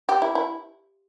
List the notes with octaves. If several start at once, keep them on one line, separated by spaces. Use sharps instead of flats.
G4
E4
E4